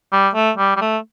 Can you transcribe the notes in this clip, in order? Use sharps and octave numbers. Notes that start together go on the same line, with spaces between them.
G3
A3
G3
G3
A3